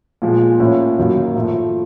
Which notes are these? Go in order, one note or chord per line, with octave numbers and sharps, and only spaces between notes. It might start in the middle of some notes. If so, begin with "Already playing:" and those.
A#2 F3 G#3
A2 F3 A#3 C#4
F#2 D#3 F#3 A#3
A2 F3 A3